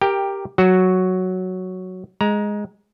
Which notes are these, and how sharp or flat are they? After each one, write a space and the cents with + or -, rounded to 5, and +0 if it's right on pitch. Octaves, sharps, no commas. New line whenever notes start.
G4 +5 A#4 +0 G5 +15
F#3 +0 F#4 +0
G#3 +0 A#5 +20